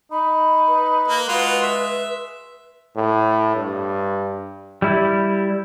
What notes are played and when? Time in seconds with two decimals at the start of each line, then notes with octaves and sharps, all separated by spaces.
0.11 D#4 B5
0.68 B4
1.08 A#3
1.28 G#3 F4 F#4 C6
1.62 E5
2.96 A2
3.56 G2
4.82 G3 E4